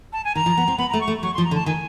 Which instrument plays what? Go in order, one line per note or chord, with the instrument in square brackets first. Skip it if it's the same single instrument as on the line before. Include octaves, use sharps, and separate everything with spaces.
[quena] A5
G#5
[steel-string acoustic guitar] D#3 [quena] A#5
[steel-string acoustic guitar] F3
B3
C4
[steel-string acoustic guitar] B3 [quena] B5
[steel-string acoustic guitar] A3 [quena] A#5
[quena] C#6
[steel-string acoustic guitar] A3
[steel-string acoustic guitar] F#3 [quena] C#6
[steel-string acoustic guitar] F3 [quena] C6
[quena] A#5
[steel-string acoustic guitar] D3
[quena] A5
[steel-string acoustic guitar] D#3 [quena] G#5